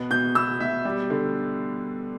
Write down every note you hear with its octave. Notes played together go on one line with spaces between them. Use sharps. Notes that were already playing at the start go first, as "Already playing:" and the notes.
Already playing: B2 B3
B2 G6
B3 E6
B2 E5
G3
D3